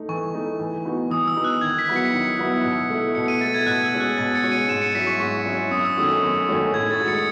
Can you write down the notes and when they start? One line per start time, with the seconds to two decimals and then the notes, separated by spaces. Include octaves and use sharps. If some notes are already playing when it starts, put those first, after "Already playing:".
Already playing: A3 D#4
0.09 E3 C#6
0.34 A3 D#4
0.60 E3
0.85 B3 D#4 F#4
1.10 E3 D#6
1.27 E6
1.36 B3 D#4 F#4
1.44 F#6
1.61 D#3 G#6
1.79 B6
1.88 F#3 B3 E4
1.96 C#7
2.13 D#3
2.38 F#3 B3 E4
2.64 B2
2.90 A3 E4
3.15 B2 C#7
3.28 D#7
3.41 A3 E4 A6
3.54 G#6
3.67 B2 F#6
3.84 E6
3.92 G#3 C#4 F#4
4.00 F#6
4.18 B2 A6
4.35 C#7
4.43 G#3 C#4 F#4
4.52 D#7
4.68 G#2 E7
4.82 C#7
4.95 F#3 C#4 E4 B6
5.07 C#6
5.20 G#2 C#6
5.46 F#3 C#4 E4
5.71 F#2 D#6
5.85 E6
5.97 D#3 A3 C#4 F#4 D#6
6.22 F#2
6.48 D#3 A3 C#4 F#4
6.73 A2 G#6
6.91 A6
6.99 G#3 D#4 F#4
7.08 C#7